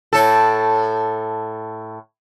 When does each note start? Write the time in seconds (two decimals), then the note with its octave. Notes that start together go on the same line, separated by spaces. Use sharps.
0.13 A2 A4